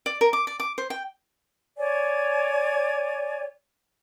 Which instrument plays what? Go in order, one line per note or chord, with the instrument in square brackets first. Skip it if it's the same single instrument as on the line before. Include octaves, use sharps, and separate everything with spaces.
[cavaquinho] D5
A#4
D6
D5
D6
C5
G5
[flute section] C#5 D5 G#5